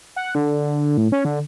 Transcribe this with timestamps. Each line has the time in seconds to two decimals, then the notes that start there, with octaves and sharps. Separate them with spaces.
0.16 F#5
0.35 D3
0.97 A2
1.12 C#4
1.25 D3